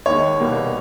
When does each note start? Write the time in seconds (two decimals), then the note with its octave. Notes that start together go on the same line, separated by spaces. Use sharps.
0.06 D#2 D#3 G#3 C#5
0.40 C2 B2 G3 A#3